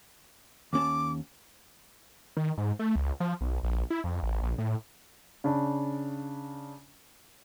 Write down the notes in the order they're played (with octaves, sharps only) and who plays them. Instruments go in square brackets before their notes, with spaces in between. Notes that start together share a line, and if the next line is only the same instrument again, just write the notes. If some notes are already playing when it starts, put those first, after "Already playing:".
[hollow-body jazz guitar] D#2 C#4 A5 [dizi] D6
[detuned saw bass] D#3
G#2
A3
C#2
F3
B1
A#1
E4
F2
A1
A#1
A2
[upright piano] C#3 D4